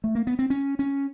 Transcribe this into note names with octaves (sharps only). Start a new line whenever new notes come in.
A3
A#3
B3
C4
C#4
C#4